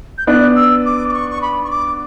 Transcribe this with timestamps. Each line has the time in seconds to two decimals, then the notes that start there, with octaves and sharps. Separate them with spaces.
0.18 G6
0.27 B3 D4 F#6
0.56 E6
0.85 D6
1.09 D6
1.13 C#6
1.30 C#6
1.42 B5
1.64 C#6
1.70 D6